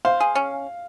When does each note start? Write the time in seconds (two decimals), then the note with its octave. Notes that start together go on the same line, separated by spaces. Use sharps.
0.05 C5 F5
0.20 G#4
0.35 C#4